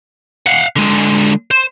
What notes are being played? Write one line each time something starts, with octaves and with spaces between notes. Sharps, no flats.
F5 F#5
D3 G#3
C5